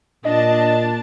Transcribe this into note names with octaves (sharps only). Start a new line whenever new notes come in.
A#2 D4 D#5 A5